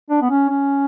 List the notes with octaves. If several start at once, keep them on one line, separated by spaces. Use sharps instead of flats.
D4
B3
C#4
C#4